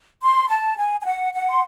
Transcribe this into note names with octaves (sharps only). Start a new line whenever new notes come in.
C6
A5
G#5
G#5
F#5
F#5
C6